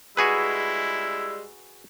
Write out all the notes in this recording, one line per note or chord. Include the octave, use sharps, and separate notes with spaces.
G3 G#3 E4 F#4 G#4 B4 E6